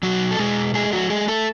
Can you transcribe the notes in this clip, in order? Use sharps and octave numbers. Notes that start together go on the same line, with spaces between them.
B2 F#3 F#4
A4
B2 G#3 G#4
G#3 A3 G#4
F#3 F#4
G#3 A3 G#4
A3 A4